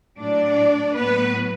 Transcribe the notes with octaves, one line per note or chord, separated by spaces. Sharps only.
A2 F#3 D4 D5
A2 F#3 B3 B4